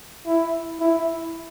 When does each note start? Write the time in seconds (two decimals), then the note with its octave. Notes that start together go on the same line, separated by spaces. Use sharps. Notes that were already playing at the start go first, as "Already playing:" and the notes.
0.26 E4
0.80 E4